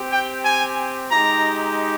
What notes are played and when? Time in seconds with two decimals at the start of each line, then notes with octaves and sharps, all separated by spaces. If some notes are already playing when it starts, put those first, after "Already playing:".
Already playing: C4 G4
0.11 G5
0.44 G#5
1.10 G#3 D#4 G4 A#5